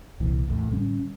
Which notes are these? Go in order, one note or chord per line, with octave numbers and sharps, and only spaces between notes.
C2 A#2 E3
A#1 E2 A2
A2 D3 G3 C#4